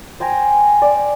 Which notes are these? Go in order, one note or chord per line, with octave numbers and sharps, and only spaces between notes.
C5 G5 G#5 A#5
D5